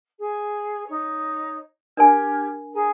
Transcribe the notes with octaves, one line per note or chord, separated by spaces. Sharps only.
G#4
D#4 C#5
D4 G4 A#4 G#5 F6 G#6
G#4 A#4 G#5